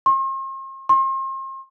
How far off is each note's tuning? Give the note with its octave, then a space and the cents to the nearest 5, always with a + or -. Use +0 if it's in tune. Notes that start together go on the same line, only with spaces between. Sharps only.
C6 +45
C6 +40